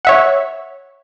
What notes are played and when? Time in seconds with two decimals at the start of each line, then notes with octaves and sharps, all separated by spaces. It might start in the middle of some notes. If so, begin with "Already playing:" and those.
0.05 C#5 E5 F#5